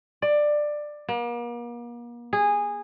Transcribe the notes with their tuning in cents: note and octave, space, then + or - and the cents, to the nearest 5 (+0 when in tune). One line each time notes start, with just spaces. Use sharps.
D5 +15
A#3 +40
G#4 -15